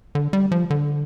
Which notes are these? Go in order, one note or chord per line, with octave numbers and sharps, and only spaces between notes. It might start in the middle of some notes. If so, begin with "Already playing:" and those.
D3
G3
F3
D3